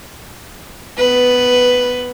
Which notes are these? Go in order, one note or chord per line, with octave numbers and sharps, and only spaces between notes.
B3 B4